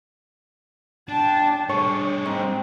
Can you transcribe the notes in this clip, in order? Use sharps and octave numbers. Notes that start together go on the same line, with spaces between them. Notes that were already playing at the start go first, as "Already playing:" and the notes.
D4 G5 A5
G3 D4 G#4 C#5
G#2 C4